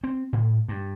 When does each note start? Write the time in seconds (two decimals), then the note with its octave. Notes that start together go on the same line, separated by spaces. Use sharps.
0.04 C4
0.33 A2
0.69 G2